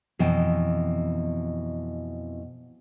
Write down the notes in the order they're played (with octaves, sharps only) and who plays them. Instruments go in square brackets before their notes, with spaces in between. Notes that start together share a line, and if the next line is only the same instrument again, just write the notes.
[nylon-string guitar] F2 B2 E3 D#5 G5